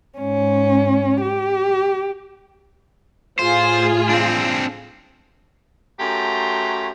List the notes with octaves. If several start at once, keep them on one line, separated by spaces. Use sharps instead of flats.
G#2 C#4
G4
A2 F4 G#4 C5
C4 D4
F#2 A3 F#4 G4 A#5 C6